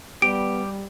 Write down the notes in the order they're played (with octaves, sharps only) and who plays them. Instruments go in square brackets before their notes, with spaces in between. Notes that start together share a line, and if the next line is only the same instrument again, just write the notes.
[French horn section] G3 [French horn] B3 [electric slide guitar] G4 [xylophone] D7